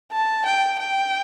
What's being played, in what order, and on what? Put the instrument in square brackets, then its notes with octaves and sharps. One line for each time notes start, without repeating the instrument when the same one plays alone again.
[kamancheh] A5
G5
G5